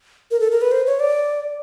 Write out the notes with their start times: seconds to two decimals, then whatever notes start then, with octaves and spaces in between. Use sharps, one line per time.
0.31 A#4
0.40 A4
0.52 A#4
0.62 B4
0.72 C5
0.86 C#5
1.00 D5